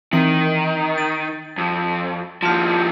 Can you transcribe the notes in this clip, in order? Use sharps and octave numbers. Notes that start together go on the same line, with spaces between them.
D#3 E3 C4 F#7
A6
F2
D#2 F3 A5 F6